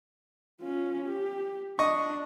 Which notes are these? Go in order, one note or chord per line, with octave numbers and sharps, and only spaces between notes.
C#4 F4
G4
D4 D#5 C#6